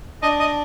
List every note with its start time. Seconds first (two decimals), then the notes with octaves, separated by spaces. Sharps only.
0.23 D4 D#5
0.40 D#5